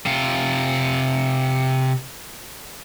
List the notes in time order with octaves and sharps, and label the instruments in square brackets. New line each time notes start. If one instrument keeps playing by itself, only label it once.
[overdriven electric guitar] C3 F4